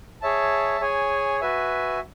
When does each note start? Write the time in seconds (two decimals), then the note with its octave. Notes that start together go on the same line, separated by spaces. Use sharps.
0.22 G#4 C#5 E5 A5
0.81 G#4 C#5 G#5
1.41 F#4 B4 E5 G#5